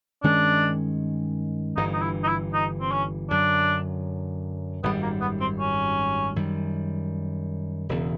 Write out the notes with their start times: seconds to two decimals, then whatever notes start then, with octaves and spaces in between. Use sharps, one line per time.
0.23 G2 D#3 G#3 C#4 D4
1.76 G1 G2 E3 D#4
1.93 D#4
2.02 E4
2.23 D#4
2.28 E4
2.54 D#4
2.80 C4
2.91 C#4
3.30 F#2 D3 F#3 D4
4.83 G#1 F#2 D#3 G3 B3
5.02 A#3
5.21 B3
5.40 C4
5.60 C#4
6.36 F#2 D#3 G3
7.89 E1 E2 C#3